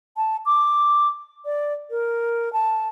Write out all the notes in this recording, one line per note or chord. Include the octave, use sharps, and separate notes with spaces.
A5
D6
D5
A#4
A5